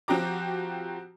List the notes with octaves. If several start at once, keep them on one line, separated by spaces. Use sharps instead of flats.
F3 C4 F#4 G4 A#5 D6